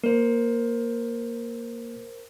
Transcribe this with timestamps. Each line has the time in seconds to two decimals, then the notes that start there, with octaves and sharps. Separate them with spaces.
0.04 A#3 A#4 C5